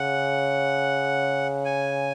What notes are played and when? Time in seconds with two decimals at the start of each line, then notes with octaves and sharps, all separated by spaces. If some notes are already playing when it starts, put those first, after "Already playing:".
Already playing: C#3 F#5
1.65 G#5